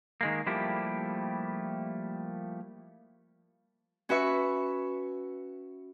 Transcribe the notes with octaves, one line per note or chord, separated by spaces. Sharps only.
D#3 G#3 A#3
F3 G3 A3 A#3 E4 G4
C#4 F#4 B4 E5 C#6